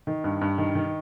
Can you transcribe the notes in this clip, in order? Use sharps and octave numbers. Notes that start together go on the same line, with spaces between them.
D#3
G2
G2
D#3
D#3